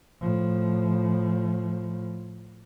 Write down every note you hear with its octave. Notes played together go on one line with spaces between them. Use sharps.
A2 F3